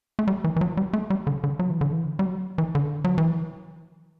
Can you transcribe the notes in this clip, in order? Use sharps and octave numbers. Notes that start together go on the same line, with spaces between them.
A3
G3
E3
E3
F#3
G3
A3
G3
D3
D3
F#3
E3
D3
E3
G3
F#3
E3
D3
F#3
E3